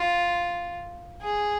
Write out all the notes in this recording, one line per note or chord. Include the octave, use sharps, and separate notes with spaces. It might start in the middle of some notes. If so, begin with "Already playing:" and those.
Already playing: F4
G#4